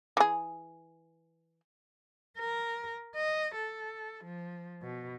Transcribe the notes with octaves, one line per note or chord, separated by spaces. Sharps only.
E3 G#4
A#4
D#5
A4
F3
B2